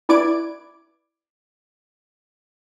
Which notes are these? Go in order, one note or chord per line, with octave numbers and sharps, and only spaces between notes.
E4 B4 D5 D6 G#6 D7